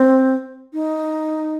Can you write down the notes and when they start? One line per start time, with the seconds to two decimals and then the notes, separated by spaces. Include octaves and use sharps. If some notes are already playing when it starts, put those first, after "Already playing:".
Already playing: C4
0.73 D#4